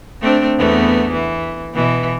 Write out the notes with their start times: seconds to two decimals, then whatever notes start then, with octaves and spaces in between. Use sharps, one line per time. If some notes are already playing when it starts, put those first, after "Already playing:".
0.21 A3 C4 D4
0.58 E2 A3 B3
1.12 E3
1.74 B2 E3